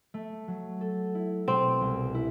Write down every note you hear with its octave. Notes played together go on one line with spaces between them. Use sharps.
A3
F#3
A4
E4
B2 C4
C2
E4